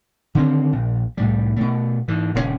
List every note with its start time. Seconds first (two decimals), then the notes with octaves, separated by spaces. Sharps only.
0.35 D3 D#3 G3 C4
0.72 A#1
1.17 C2 A2 G3
1.56 B2 A3
2.08 G#2 E3
2.34 D#1 C#2 C#3 C#4